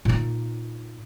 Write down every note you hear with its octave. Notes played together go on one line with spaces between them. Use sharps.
A#2 D#4